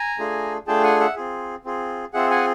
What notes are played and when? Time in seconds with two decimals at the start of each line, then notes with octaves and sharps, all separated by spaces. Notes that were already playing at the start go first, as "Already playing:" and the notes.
Already playing: G#5 A#5
0.19 A3 D4 F4 G#4
0.67 A3 D4 F4 G#4 G5 A5
0.83 F#5 G#5
1.00 E5 F#5
1.16 C4 F4 G#4
1.65 C4 F4 G#4
2.14 C4 F4 G#4 E5 F#5
2.30 F#5 G#5